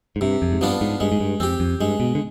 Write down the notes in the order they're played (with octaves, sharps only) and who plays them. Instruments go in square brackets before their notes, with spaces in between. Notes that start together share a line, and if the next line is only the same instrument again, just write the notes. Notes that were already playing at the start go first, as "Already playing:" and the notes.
[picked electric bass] G#2
[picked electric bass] G2 [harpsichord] C3
[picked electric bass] F2
G#2
[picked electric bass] G2 [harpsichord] F3 B3 D4 F4
[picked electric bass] G#2
[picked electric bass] G2 [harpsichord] G#3
[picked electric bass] G#2
G2
[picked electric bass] F2 [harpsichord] C4 G4
[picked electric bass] F2
[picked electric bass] G2 [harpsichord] G#3
[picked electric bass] B2
D3